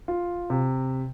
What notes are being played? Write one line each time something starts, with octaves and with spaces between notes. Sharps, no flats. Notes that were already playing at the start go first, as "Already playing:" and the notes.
F4
C3